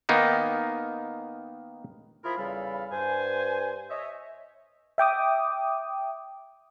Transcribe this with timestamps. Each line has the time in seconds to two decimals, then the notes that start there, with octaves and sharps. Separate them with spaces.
0.09 D#3 A#3 B3 D#4
2.25 F3 E4 F4 G#4 A#4 B5
2.38 E2 C#3 G3 A4 F5 B5
2.92 G2 C5 G#5
3.90 C#5 D#5 E5
4.98 E5 G5 D6 D#6